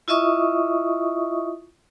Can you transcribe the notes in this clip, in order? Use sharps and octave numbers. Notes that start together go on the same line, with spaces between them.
E4 F4 D#5 E5 C#6 D#6